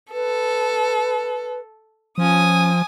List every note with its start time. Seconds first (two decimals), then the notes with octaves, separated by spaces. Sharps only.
0.13 A4 B4
2.18 F3 C#4 G#5 D#6